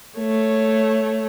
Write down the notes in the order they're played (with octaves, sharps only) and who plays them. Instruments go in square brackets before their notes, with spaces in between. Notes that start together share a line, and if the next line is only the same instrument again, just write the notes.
[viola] A3 C#5